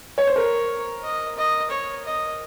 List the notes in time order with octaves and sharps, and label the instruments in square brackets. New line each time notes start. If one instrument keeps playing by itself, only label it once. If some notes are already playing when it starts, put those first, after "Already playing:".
[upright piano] C#5
C5
[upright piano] A#4 [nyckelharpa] C#5
[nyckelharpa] D#5
D#5
C#5
D#5